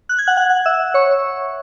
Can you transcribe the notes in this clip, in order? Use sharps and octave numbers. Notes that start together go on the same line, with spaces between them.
F#6
G#6
F#5 F#6
F#5 F#6
E5 E6
C#5 C#6